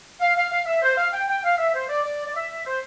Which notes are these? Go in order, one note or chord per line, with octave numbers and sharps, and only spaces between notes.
F5
F5
F5
E5
C5
F5
G5
G5
F5
E5
C5
D5
D5
D5
E5
C5